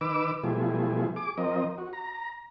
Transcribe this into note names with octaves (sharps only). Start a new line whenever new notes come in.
D#3 B4 D6 E6
B2 F3 G3 A3 E4 G#4
G#4 D6
F3 C4 A#4 D#5
F#4
A#5